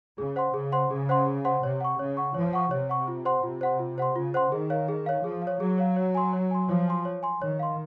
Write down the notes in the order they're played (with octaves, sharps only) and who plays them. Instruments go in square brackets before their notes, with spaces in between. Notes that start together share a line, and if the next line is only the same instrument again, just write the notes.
[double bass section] C#3 [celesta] G#4
[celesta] C5 F#5 C6
[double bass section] C#3 [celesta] G#4
[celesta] C5 F#5 C6
[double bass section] C#3 [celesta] G#4
[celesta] C5 F#5 C6
G#4
C5 F#5 C6
[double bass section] C3 [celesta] C#5
[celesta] F#5 C#6
[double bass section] C#3 [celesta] C#5
[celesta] F#5 C#6
[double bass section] F3 [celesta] C#5
[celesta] F#5 C#6
[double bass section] C3 [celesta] C#5
[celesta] F#5 C#6
F4
C5 F#5 C6
[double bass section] C3 [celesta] F4
[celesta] C5 F#5 C6
F4
C5 F#5 C6
[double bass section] C#3 [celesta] F4
[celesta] C5 F#5 C6
[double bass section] D#3 [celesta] G#4
[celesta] C#5 F5
G#4
C#5 F5
[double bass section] F3 [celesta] G#4
[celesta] F5
C#5
[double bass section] F#3 [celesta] G#4
[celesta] C#5 F5
C#5
G#5 C6
C#5
G#5 C6
[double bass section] F3 [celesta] C#5
[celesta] G#5 C6
C#5
G#5 C6
[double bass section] D#3 [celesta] C#5
[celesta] F5 C6